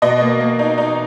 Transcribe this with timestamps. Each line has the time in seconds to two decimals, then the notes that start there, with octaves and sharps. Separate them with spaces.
0.02 B2 D#5
0.21 A#3
0.40 A#3
0.59 D#4
0.78 D#4